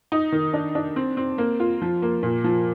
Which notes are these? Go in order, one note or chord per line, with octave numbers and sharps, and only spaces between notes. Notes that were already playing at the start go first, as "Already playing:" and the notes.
D#4
D#3
D4
D4
C4
C4
A#3
F4
F3
A#3
A#2
F3